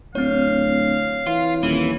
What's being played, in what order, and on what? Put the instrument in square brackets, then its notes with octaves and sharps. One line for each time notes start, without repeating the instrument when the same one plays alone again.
[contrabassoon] D1 [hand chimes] C4 C#5 [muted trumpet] F5
[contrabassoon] E3 [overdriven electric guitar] F4
[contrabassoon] D#1 [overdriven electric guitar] E3